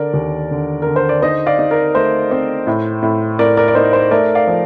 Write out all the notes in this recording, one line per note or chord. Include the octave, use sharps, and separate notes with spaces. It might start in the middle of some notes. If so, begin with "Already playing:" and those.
Already playing: D3 A#4 D5
D#2
D3
D3 A#4
C5
D5
D#4 C5 D#5
D5 F5
D#4
A#4 D5
A3 C5
C4
A2
A2
A2 A#4 D5
A#4 D5
D5
D#4 C5
C5
A3 A#4 D5
D5 F5
F3